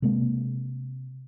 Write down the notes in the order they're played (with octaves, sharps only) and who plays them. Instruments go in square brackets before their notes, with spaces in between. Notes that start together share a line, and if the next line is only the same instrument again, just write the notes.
[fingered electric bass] C3 G#3 A#3